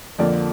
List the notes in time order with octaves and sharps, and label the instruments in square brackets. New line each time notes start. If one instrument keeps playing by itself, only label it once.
[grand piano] F2 D3 F3 A#3 D5